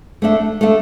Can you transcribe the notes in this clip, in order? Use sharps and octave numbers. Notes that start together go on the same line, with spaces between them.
A3 D4 A4 E5
A3 D4 A4 E5